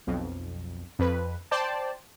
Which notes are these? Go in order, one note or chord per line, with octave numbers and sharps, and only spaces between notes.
B1 F2
F2 B4
C5 D5 G5 A5